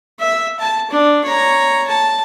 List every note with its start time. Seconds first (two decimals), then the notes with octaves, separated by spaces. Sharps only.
0.20 E5
0.59 A5
0.90 D4
1.24 C#5 A#5
1.87 A5